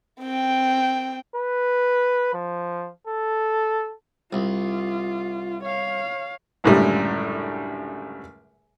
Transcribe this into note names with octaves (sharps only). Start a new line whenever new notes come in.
C4 G5
B4
F3
A4
C2 F4
C#5 F5
C#2 F#2 A2 D3 G3